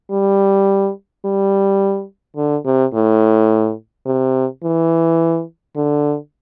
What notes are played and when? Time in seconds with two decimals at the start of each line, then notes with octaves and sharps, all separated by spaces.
0.11 G3
1.25 G3
2.37 D3
2.65 C3
2.94 A2
4.06 C3
4.63 E3
5.76 D3